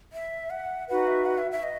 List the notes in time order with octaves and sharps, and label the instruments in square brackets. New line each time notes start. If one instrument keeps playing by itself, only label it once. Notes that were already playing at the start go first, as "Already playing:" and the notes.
[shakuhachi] E5
F#5
[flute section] D#4 F#4 B4 [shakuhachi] F#5
[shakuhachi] E5
F#5
E5
E5
D#5